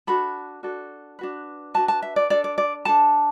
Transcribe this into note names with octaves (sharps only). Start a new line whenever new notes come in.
D4 F#4 A4 B5
D4 F#4 A4
D4 F#4 B4
D4 F#4 B4 A5
A5
E5
D5
D4 A4 D5
D5
D5
D4 A4 A5